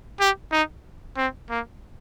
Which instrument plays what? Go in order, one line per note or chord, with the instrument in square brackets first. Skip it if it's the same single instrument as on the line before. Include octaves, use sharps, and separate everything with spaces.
[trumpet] G4
D#4
C4
A#3